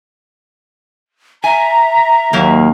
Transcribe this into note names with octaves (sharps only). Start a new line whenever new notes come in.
E5 G#5 A#5
D#2 F#3 A#3